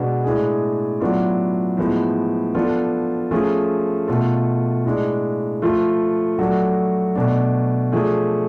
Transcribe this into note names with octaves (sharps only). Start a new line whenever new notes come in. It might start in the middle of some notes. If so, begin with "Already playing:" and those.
Already playing: B2 G#3 B3 D4 F#4
A2 G#3 D4 G#4
A2 F#3 B3 D4 F4
A2 F3 G#3 B3
F3 B3 D4 F4 A4
F3 A3 C#4 F4 G#4
B2 A3 F4 A4
A2 G#3 D4
F3 A3 F4 A4
F#3 A3 D4 F#4 A4
B2 A3 D4
F3 A3 D4 G#4